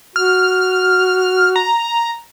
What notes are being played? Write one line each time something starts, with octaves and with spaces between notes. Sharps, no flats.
F#4 F6
A#5